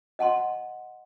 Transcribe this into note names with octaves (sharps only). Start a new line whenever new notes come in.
D#5 F#5 A5 C6